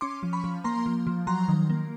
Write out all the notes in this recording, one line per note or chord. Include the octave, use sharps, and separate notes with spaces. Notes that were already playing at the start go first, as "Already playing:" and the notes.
C#4 C6 D6
F3
B5 C#6
F3
A#3 A#5 C6
F3
F3
F#3 A#5 C6
D#3
A#3